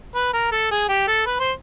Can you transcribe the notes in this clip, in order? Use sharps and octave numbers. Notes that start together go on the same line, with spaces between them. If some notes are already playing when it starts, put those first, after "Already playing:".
B4
A#4
A4
G#4
G4
A4
B4
C5